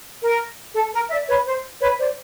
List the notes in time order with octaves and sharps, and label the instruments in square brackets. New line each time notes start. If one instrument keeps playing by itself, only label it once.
[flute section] A#4
A4
A#4
D5 E5
B4 C#5
C5
B4 C#5
C5 D5